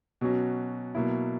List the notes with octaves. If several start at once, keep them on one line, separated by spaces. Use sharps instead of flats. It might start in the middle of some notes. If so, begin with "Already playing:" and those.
B2 F#3 C#4 F#4
B2 F#3 A#3 E4